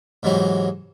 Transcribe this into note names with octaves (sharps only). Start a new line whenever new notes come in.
G#2 C3 E3 F#3 D#4